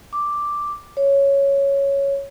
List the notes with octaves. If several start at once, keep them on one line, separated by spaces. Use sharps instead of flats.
D6
C#5